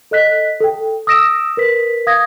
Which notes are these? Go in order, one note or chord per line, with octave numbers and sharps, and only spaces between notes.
A4 D#5 F#6 B6
A4 G5
D#6 E6 A#6 D7 E7
A#4 B4 B6
F5 D#6 G#6 A#6